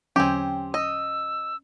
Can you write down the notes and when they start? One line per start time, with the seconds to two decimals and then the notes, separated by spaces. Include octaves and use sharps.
0.16 E2 D3 F#3 C4 C#4 G4 G#5
0.74 D#5 E6